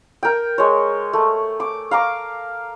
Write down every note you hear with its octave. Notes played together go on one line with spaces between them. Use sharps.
A#4 G5
G#3 C#5
A3
D6
F5 A#5 D6